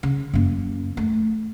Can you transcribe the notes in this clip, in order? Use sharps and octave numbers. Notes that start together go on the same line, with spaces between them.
C#3
F#2 A#3
A3